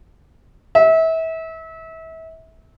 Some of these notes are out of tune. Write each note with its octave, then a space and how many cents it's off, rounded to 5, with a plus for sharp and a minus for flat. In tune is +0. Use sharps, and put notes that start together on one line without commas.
E5 -30